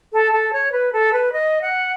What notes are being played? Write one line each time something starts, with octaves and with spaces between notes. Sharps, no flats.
A4
A4
C#5
B4
A4
B4
D#5
F#5